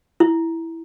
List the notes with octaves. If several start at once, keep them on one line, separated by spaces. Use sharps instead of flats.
E4